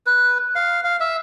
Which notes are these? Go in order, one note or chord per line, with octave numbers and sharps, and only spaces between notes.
B4
F5
F5
E5